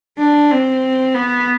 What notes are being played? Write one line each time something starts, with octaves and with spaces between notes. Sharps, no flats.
D4
C4
B3